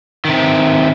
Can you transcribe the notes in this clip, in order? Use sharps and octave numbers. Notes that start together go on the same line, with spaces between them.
C3 D#3